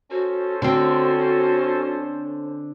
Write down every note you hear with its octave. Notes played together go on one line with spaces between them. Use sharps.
C#4 F#4 A4 C5
D3 C4 F#4